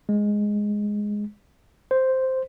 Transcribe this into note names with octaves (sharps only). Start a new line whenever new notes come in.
G#3
C5